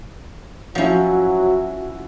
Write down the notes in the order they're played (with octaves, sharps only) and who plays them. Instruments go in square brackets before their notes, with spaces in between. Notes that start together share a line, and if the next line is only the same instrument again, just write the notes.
[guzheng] F3 C#4 [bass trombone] F#3 [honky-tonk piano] E4 F#4